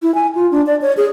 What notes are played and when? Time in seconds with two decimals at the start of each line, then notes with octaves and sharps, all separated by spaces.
0.02 E4
0.15 G#5
0.35 F4
0.51 D4
0.67 D5
0.82 C#5
0.97 G#4